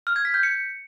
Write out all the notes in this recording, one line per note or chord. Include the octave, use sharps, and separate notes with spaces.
F6
G#6
B6
G6
C#7